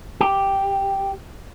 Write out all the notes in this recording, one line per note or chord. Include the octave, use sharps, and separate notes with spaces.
G4